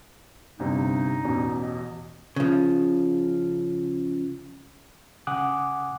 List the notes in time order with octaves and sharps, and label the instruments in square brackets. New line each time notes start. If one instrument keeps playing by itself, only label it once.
[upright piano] G1 C3 [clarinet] D#4
[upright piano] A1 E2 B2
[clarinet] D#5
[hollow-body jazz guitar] C#3 F3
[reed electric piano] C#3 F#5 G#5 D6 D#6 F#6